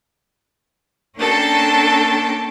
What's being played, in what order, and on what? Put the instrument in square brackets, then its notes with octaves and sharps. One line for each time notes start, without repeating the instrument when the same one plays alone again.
[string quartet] A#3 C#4 D4 A4 G5 A5